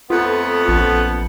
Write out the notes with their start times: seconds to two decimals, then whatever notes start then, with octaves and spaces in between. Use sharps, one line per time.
0.10 F2 A3 B3 F4
0.68 A#1